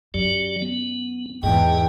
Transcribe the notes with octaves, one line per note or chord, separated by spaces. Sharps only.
F#2 F#3 G4 D5
B3
E2 G#2 G#4 D#5 G5